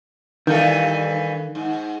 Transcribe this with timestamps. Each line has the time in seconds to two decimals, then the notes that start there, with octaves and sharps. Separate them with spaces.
0.47 G2 D#3 E3 A4
1.55 G#2